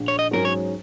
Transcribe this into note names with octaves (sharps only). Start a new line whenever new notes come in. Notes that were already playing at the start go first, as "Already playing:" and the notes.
Already playing: A#1
C#5
D#5
G#2 F#3 C#4 G#4 A#4
C#5